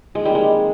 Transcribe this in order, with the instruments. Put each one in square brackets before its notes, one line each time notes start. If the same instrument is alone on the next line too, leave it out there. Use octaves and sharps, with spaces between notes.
[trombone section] F2 D#3 A#3 D#4 A#4 [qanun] G#3
[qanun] G3
G#3